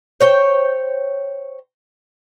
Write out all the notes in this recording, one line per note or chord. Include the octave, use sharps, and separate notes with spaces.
C5 C#5 G5